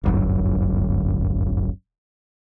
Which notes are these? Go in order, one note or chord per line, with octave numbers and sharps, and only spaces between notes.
D1 G1 F#2